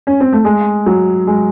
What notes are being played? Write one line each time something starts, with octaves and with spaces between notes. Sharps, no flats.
C#4
C4
A3
G#3
F#3
G#3